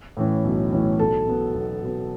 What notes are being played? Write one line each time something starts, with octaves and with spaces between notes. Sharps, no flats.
A2 E3 C#4
B1
A2 E3 C#4
B1 A4
B2 B3
B1
B2 B3